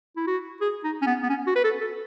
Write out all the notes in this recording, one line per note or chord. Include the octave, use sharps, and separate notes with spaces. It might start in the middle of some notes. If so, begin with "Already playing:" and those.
E4
F#4
G#4
D#4
C#4
B3
B3
C#4
F#4
B4
A4
A4